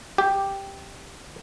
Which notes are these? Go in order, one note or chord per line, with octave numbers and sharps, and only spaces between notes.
G4